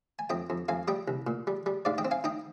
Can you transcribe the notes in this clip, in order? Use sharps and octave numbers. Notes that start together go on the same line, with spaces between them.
G#5
F2 D#5 G5
F2
F2 F5 G#5
G3 D#5 G5
C2
A#2
G3
G3
G#2 D5 F5
D#5 G5
C4
F5 G#5
D#4 D#5 G5